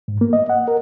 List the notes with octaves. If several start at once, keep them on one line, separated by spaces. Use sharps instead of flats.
G#2
A#3
D#5
F#5
A#4